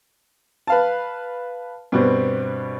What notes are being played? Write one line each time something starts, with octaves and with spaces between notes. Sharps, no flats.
B4 F5 A5
G2 B2 C4